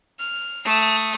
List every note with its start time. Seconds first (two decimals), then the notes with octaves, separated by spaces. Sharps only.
0.19 F6
0.65 A3 D#6